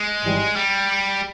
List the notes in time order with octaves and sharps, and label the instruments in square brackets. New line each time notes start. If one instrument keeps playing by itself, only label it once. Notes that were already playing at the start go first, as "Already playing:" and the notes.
Already playing: [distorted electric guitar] G#3
[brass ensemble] G#1 G#2 E3 G3
[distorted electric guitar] G3